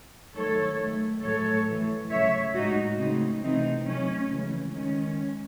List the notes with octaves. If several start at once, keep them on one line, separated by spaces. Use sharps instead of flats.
D#3 F#3 A3 A4 C#5
D#3 A3
A2 F#3 A3 A4 C#5
A2 E3 A3
C#3 F#3 A3 C#5 E5
A2 G#3 D#4 F#4
C#3 F#3 A3 C4 D#4
C3 E3 A3 C4 D#4
C3 F#3 A3 C#4
C#3 E3 G#3
D#3 G#3 C#4